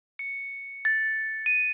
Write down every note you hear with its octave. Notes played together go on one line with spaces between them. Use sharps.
C#7
A6
D#7